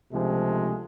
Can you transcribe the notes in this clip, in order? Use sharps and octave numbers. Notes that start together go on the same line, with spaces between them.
C#2 C3 F3 G#3 A3 D4